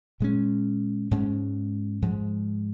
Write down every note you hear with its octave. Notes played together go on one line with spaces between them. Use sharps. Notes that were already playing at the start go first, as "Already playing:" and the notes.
A#2 G#3 C#4
G#2 G#3 C#4
G#2 F3 G#3